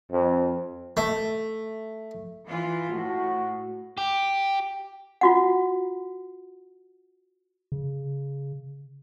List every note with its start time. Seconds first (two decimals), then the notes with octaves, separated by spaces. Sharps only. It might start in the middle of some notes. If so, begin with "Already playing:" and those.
0.12 F2
0.97 A3
2.47 E3 F4
2.91 A2 F#4
3.98 G4
5.21 F4 F#4 F#5
7.72 C#3